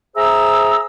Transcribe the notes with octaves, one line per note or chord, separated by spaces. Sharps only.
G#4 C5 E5 A#5 E6